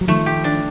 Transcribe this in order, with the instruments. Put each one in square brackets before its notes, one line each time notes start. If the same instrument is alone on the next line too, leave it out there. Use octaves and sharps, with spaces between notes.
[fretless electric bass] F#3
[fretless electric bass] D#3 F3 [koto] A3
[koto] G4
D4